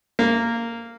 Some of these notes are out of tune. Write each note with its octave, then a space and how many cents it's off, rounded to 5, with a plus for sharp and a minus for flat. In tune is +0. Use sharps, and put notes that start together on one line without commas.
A#3 -10